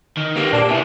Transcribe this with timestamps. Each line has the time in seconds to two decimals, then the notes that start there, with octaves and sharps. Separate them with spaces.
0.17 D#3
0.36 A#3 C4 G4 B4
0.53 A#2 D4 G4
0.70 C3 E3 E4